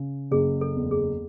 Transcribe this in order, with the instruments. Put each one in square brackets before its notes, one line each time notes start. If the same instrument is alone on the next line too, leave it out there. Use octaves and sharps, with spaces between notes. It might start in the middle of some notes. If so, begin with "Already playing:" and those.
Already playing: [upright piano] C#3
[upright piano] F#1 [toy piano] G#4
[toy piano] A4
[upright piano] E2
[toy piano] G#4